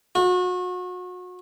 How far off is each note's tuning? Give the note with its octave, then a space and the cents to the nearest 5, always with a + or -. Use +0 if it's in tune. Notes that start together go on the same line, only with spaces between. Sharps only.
F#4 -35